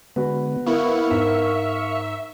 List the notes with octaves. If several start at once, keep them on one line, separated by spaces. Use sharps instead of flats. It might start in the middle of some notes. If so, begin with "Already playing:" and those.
D3 G#3 B3 F#4 B4
B3 E4 A#4 F5 C#6
G#2 E5